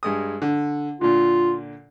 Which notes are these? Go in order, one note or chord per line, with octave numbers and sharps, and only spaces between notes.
G2 G#3 D#6
D3
A#2 D3 F4